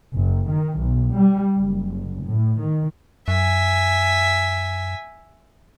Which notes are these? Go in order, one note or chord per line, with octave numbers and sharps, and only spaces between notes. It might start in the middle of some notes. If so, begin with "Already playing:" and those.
F#1
D#3
B1
G3
F#1
A2
D#3
F#2 E5 G#5